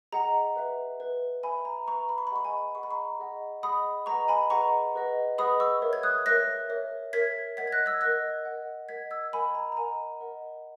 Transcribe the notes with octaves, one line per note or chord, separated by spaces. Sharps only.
G#4 D#5 F#5 A#5
B4 E5
B4 E5
B4 E5 G#5 B5
A#5
B4 E5 A#5 C#6
B5
C#6
B5
G#4 D#5 F#5 C#6
G#5 B5
G#4 D#5 F#5 C#6
B5
A#5 C#6
G#4 D#5 F#5
G#4 D#5 F#5 B5 D#6
G#4 B4 D#5 F#5 A#5 C#6
G#5 B5
G#4 B4 D#5 F#5 A#5 C#6
G#4 B4 D#5 F#5
G#4 B4 D#5 F#5 B5 D#6
C#6 E6
A#4 C#5 E5
G#6
D#6 F#6
A#4 C#5 E5 F#6 A#6
A#4 C#5 E5
A#4 C#5 E5 G#6 B6
A#4 D#5 F#5 G#6 B6
G#6
F#6 A#6
E6 G#6
A#4 D#5 F#5 F#6 A#6
A#4 D#5 F#5
A#4 D#5 F#5 G#6 B6
E6 G#6
A#4 D#5 F#5 G#5 B5
A#5
A#5
A#4 D#5 F#5 G#5
A#4 D#5 F#5